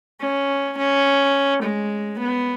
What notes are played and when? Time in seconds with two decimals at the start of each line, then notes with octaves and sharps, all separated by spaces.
0.21 C#4
0.77 C#4
1.62 G#3
2.19 B3